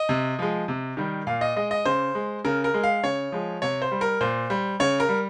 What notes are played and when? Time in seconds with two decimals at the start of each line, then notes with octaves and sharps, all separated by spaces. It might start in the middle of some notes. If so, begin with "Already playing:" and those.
Already playing: D#5
0.09 C3
0.39 F3 G#3
0.68 C3
0.97 D#3 G3
1.27 A#2 F5
1.41 D#5
1.56 G#3 D#5
1.71 D#5
1.85 C#3 C5
2.15 G#3
2.45 C#3 A#4
2.64 A#4
2.74 G#3
2.83 F5
3.03 C#3 C#5
3.32 F3 G#3
3.62 C3 C#5
3.82 C5
3.92 G3
4.01 A#4
4.21 A#2 C5
4.50 G3
4.80 C#3 C#5
5.00 A#4
5.09 G3